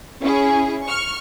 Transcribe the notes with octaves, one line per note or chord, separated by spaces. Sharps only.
C#4 E4 G#4
C#6 F6